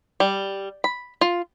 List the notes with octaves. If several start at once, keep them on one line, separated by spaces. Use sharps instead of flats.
G3
B5
F4